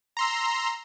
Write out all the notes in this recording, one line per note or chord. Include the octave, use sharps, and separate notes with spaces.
A#5 C6 E6